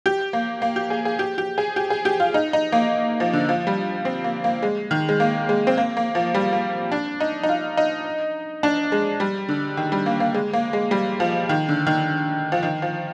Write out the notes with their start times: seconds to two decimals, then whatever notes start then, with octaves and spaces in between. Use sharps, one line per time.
0.06 G4
0.33 A#3
0.62 A#3
0.76 G4
0.90 G#4
1.05 G#4
1.19 G4
1.38 G4
1.58 G#4
1.76 G4
1.90 G#4
2.05 G4
2.20 F4
2.34 D#4
2.53 D#4
2.72 A#3
3.20 F3
3.33 D3
3.49 F3
3.67 G3
4.05 C4
4.24 A#3
4.44 A#3
4.63 G#3
4.91 D#3
5.09 G#3
5.20 A#3
5.49 G#3
5.67 C4
5.78 A#3
5.97 A#3
6.15 F3
6.35 G3
6.53 A#3
6.92 D4
7.20 D#4
7.43 D#4
7.49 F4
7.77 D#4
8.63 D4
8.92 G#3
9.20 G3
9.49 D3
9.77 D#3
9.92 G3
10.06 A#3
10.20 A#3
10.34 G#3
10.53 A#3
10.73 G#3
10.91 G3
11.20 F3
11.49 D#3
11.69 D3
11.86 D#3
12.52 F3
12.63 D#3
12.82 F3